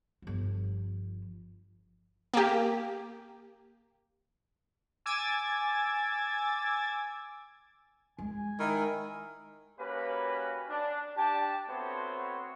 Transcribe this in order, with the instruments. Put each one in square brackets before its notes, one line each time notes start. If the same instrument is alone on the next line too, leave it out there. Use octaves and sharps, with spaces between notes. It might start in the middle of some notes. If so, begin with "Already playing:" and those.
[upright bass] G1 F3
[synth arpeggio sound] A#3 G4
[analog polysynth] G#5 D6 E6 G#6 A6
[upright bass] G#3 [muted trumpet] G#5
[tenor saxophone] D#3 [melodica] E4 A#4
[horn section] A#3 C#4 F#4 G4 B4
D4
D4 G4 G5 A5
A3 B3 C4 F#4 C5 C#5